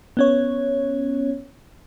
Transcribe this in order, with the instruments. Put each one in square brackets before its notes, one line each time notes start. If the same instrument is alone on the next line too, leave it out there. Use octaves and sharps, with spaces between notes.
[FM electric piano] B3 C#4 C#5